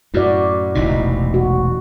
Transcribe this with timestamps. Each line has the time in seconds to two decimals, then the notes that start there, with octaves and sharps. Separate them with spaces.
0.14 F#2 A2 E4 F#4 D5
0.75 E1 A1 C3 D#4 E4
1.34 F#4